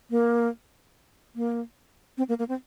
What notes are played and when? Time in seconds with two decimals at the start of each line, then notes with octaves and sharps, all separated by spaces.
0.11 A#3
1.35 A#3
2.18 C4
2.29 A#3
2.39 A#3
2.49 C4